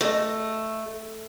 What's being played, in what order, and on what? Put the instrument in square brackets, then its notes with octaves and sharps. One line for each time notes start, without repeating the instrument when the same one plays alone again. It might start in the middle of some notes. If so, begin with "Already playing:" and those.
[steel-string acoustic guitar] A3 [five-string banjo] F#4 D#5